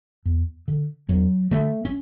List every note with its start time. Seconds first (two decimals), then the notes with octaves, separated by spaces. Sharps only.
0.25 E2
0.68 D3
1.09 E2 F#3
1.51 D3 A3
1.85 C#4